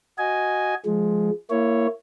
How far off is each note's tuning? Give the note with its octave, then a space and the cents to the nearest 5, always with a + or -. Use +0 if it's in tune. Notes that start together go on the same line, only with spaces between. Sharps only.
F#4 +0 D#5 +0 G#5 +0
F3 +0 G#3 +10
A#3 -10 E4 +15 C#5 +0